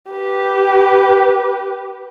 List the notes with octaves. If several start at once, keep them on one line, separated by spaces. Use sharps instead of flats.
G4 B4